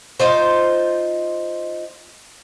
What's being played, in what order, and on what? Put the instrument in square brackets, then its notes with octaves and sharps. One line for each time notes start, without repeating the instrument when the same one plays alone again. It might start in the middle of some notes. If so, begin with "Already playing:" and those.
[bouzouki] D#4 F4 C5